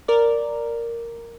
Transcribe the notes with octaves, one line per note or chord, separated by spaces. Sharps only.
A#4 D5